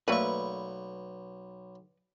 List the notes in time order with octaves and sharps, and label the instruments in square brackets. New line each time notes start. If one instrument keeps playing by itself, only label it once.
[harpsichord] B1 C#6 [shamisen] A3 A#3 [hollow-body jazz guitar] B4 [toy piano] D5 F5 E6